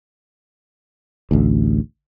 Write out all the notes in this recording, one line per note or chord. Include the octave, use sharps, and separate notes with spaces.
A1 D2